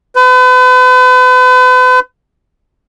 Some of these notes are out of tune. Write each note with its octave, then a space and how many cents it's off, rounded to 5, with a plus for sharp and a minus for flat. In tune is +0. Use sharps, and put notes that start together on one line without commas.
B4 +40